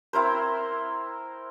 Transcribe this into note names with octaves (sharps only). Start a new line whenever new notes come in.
C4 E4 A#4 C5